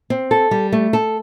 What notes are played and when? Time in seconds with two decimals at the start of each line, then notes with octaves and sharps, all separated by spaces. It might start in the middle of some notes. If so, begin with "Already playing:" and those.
0.10 C4
0.31 A4
0.51 G3
0.73 A3
0.93 A4